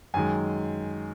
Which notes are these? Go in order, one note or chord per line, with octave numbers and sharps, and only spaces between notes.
F#2 D#3 G#3 G#5